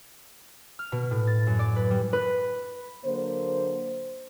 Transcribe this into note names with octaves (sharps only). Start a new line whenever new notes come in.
F6
B2
A2
A6
F#2
D5
B4
G3
B4
D3 F#3 A#3 C5